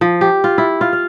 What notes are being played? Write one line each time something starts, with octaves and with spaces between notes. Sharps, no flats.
F3
G4
F4
E4
F4
F5